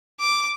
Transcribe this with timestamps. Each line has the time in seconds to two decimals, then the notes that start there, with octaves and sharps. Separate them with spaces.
0.20 D6